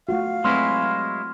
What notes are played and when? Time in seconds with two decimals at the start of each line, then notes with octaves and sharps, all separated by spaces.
0.09 A3 F4 F#4 F5
0.44 F#3 G#3 A3 C4 E4 B4 C6 F6